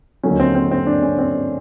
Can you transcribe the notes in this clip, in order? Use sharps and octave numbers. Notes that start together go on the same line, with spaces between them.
D#2 D3 F#3 C#4
C4
C4
C4
D4
C#4
C4